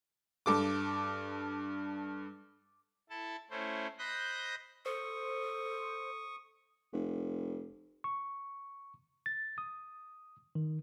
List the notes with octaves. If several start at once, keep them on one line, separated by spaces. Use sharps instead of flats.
G2 A4 D6
E4 A4 A5
A3 C#4 E4 C5
C5 D#5 B5 F#6 G6 A#6
A4 C5 C#6 D#6
F1
C#6
A6
D#6
D#3